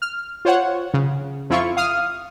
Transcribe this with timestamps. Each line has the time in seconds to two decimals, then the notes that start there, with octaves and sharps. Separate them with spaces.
0.02 F6
0.45 F4 C5 C#5 F#5
0.94 C#3
1.50 F2 E4 F4 C#6
1.77 F5 D#6 F6